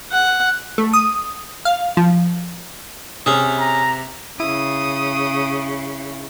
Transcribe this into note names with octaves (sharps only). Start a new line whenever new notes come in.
F#5
A3
D#6
F5
F3
C3 C#4 G#4
A#5
C#3 E4 D#6